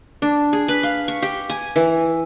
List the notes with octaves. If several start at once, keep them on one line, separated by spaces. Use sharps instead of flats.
D4
G#4
B4
F5
C#6
G4
G#5
E3